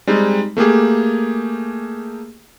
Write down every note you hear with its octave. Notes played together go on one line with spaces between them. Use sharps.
G3 G#3 C4 D#4
A3 A#3 G4 G#4